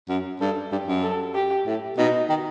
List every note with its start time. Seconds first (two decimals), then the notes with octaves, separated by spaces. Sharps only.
0.09 F#2
0.41 G2 A4
0.72 G2 G4
0.87 F#2
1.03 A4
1.35 G4
1.66 A2
1.98 B2 D#4
2.29 D#3